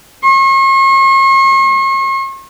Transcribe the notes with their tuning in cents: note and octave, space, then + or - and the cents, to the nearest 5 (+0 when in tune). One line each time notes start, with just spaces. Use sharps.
C#6 -45